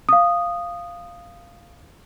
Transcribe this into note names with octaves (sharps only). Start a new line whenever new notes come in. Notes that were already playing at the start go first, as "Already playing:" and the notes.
F5 D#6